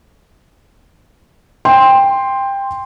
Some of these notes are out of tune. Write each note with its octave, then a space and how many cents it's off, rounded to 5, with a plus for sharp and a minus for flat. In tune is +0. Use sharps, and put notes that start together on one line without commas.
G5 +15 C6 +0